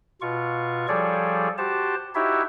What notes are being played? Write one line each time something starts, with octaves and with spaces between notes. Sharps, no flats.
B2 F4 C#6
F3 G3 G#4 A4 C#5 D5
F#4 G4 C5 A5
D#4 E4 F#4 G4 C#5 E5